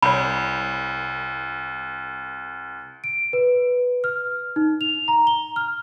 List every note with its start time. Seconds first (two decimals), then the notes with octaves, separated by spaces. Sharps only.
0.03 C2 C#5 B5
3.04 D7
3.33 B4
4.04 F6
4.56 D#4
4.81 F7
5.08 A#5
5.27 G7
5.56 F6